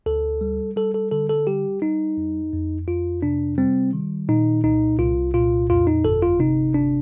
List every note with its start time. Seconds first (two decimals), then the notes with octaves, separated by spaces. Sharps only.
0.06 D2 A4
0.41 G3
0.76 G3 A4
0.94 A4
1.11 D3 A4
1.29 A4
1.47 G3 G4
1.82 G3 D#4
2.17 F2
2.53 F2
2.87 F2 F4
3.22 C3 D4
3.58 G3 C4
3.93 D#3
4.29 A#2 D#4
4.64 C2 D#4
4.99 C2 F4
5.34 A#2 F4
5.70 F2 F4
5.87 D#4
6.05 G1 A4
6.23 F4
6.39 C3 D#4
6.74 G1 D4